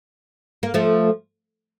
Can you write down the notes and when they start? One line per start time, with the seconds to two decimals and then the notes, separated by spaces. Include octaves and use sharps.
0.63 A#3
0.74 F3 A3